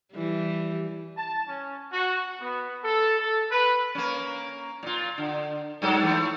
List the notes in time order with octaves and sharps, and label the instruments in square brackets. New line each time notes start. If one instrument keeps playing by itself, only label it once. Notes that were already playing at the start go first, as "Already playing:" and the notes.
[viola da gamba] E3 G3
[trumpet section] A5
C#4
F#4
B3
A4
A4
B4
[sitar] A#3 C#4
A#2 F4
D3
G2 F#3 A4
E3 A3